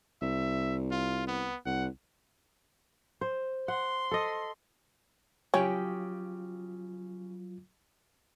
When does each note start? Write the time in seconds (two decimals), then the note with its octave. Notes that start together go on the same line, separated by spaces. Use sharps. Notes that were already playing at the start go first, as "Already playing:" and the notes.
0.22 C2 E5
0.91 F4
1.28 B3
1.66 C2 F#5
3.21 C5
3.68 F#5 C6
4.11 A4 D#5
5.54 C#3 F#3 C#4 F4 G4 G5